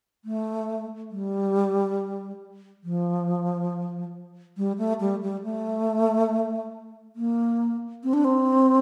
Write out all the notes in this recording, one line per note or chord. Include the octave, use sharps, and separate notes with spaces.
A3
G3
F3
G3
A3
G3
G3
A3
A#3
C4
D4
C4